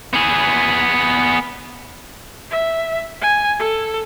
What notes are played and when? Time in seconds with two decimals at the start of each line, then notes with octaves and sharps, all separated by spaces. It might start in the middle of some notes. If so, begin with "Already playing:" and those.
0.14 B3 G#4
2.51 E5
3.21 G#5
3.59 A4